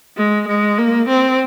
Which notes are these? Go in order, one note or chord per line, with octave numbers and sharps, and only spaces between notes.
G#3
G#3
A#3
C4